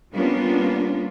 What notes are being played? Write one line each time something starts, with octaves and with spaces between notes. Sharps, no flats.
G3 A#3 B3 C#4 D4 F4